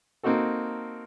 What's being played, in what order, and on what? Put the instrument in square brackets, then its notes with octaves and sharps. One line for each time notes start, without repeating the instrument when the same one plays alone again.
[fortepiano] A#3 C4 D#4 F#4 A4